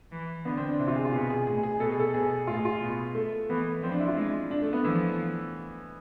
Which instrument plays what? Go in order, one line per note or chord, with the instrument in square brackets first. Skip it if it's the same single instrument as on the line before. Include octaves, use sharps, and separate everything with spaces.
[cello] E3
[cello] D3 [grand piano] B3
[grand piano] C4
D4
[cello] C3 [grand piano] E4
[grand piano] F4
G#4
F4
[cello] B2 [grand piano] G#4
[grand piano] G#4
[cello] A2 [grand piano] G#4
[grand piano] G#4
[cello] B2 [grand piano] A4
[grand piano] G#4
A4
[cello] B2 [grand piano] G#4
[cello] A2 [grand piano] F4
[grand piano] G#4
F4
[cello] B2
[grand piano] A3
[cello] E3 [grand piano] B3
[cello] F3 [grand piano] C4
[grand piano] D4
E4
F4
[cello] G#3 [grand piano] E4
[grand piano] D4
A3
B3
[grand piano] E3 [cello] F3